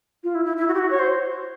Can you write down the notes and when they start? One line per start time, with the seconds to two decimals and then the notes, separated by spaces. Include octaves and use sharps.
0.24 F4
0.35 E4
0.45 E4
0.57 E4
0.68 F#4
0.74 G4
0.79 F#4
0.90 C#5
0.99 C5